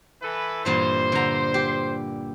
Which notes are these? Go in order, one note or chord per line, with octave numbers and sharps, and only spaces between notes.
E3 A4 B4
G2 A#2 E3 C5
D3 A#5
G4